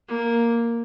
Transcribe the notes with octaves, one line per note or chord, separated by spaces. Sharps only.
A#3